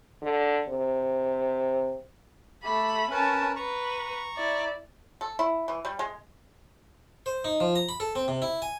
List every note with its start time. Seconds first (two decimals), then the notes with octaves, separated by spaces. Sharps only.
0.22 D3
0.68 C3
2.63 A3 G4 B5
3.11 C#4 A#4 B4 A5
3.56 B4 A#5 C#6
4.37 E4 D5
5.21 A4
5.39 E4
5.68 E3
5.85 G3
5.99 G#3
7.26 C5
7.45 D#4
7.60 F3
7.75 A#5
7.89 B5
8.00 A4
8.15 C4
8.28 C3
8.42 E4
8.62 G#5